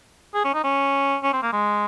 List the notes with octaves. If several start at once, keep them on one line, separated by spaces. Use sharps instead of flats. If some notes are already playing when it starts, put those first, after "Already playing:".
G#4
C#4
D#4
C#4
C#4
C4
A#3
G#3